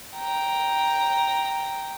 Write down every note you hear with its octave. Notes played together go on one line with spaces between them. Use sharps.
G5 A#5